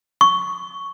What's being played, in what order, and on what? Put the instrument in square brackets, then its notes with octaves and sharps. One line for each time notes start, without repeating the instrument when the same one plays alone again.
[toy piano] C#6